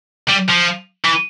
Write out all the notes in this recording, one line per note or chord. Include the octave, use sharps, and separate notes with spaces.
G3
F3
E3